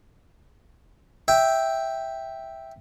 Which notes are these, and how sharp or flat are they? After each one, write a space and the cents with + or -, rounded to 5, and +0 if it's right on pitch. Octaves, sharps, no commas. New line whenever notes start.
E5 -5 G5 +0